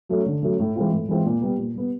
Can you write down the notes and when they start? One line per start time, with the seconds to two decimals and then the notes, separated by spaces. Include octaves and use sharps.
0.09 F#3 A3 C#4
0.26 D3
0.42 F#3 A3 C#4
0.59 A2
0.75 E3 G#3 C4 F4
0.92 A2
1.08 E3 G#3 C4 F4
1.26 A#2
1.41 G3 B3
1.58 A#2
1.75 G3 B3